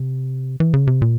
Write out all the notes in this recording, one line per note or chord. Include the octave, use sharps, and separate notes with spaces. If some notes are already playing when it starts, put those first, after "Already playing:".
Already playing: C3
E3
C#3
C3
A#2